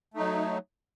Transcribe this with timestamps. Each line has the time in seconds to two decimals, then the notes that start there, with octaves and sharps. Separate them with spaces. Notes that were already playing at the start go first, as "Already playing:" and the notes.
0.14 A3
0.17 D#4
0.20 F#3